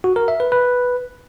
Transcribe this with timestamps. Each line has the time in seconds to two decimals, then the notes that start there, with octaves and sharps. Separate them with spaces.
0.04 F#4
0.16 A#4
0.28 E5
0.40 B4
0.52 B4